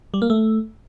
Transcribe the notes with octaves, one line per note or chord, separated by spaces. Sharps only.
G3
A#3
A3